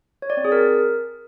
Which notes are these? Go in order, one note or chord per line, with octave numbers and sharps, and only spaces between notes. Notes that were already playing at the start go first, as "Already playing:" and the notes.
C#5
D5
C4
G#4
A#4